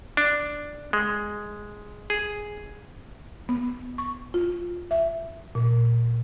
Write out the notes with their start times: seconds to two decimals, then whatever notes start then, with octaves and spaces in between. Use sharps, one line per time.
0.17 D4
0.93 G#3
2.10 G#4
3.49 B3
3.98 C#6
4.34 F4
4.91 E5
5.55 A#2